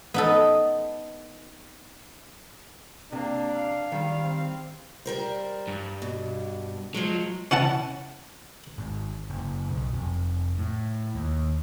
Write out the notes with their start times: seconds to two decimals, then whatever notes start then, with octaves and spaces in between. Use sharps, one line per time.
0.14 B3 D#4 A4
3.12 C3 A#3 D4
3.54 F5
3.92 D#3 G3
4.23 C4
5.06 G3 A#4 C5
5.68 G2
6.02 B2
6.94 F3 F#3 G#3
7.51 C#4 E4 F#5 A5
8.78 G#1
9.30 F#1
9.70 B1
9.93 F1
10.59 A2
11.15 D#2